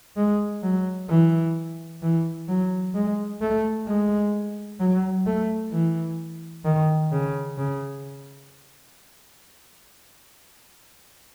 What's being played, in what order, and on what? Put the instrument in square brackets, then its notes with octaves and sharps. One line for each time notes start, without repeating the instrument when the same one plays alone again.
[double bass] G#3
F#3
E3
E3
F#3
G#3
A3
G#3
F#3
A3
E3
D#3
C#3
C#3